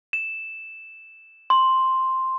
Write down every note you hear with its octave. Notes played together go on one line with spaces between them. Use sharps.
E7
C6